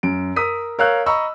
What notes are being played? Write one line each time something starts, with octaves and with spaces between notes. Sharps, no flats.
F#2 D7
A#4 D#6 E6 B6 D#7
A#4 C#5 F5 E6 F#6 G6
D#5 A#5 B5 C#6 E6